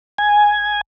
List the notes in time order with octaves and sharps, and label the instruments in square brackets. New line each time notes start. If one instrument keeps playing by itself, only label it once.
[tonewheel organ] G#5